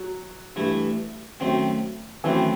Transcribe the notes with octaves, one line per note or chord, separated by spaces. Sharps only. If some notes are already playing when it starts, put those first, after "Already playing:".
Already playing: F#3
G2 E3 A3 E4
F#2 D#3 A3 C4
F#2 D#3 E3 A3 C4